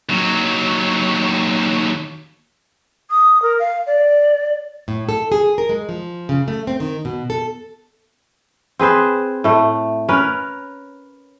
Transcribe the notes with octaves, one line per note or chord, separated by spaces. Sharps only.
D#2 F#3
D#6
A#4
F5
D5
A2
A4
G#4
A#4
G#3
F3
C#3
A3
C4
D#3
B2
A4
C4 G#4 B4 C5
A2 A3
C#4 A#4 B4